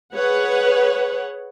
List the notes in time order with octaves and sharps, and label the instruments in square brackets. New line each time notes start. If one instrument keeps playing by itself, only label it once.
[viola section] G#4 B4 C#5 F#5